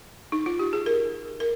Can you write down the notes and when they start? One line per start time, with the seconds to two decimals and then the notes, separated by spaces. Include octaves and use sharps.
0.32 D#4
0.46 F4
0.59 G4
0.73 G#4
0.86 A#4
1.40 A#4